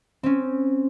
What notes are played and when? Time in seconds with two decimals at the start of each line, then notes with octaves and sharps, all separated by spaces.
0.23 C4 C#4